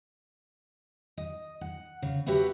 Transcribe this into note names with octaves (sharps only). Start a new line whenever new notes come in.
D#5
F#5
C#3
F#4 G4 B4 C#5 E5 F#5